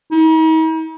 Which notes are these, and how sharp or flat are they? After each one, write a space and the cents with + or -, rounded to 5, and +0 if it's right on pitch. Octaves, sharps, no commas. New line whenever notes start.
D#4 +45